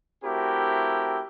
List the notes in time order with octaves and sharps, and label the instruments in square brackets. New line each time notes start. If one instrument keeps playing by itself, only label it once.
[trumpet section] A3 C4 E4 F#4 G4 A#4